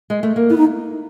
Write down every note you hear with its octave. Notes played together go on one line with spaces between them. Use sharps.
G#3
A3
A#3
B3 E4
D#4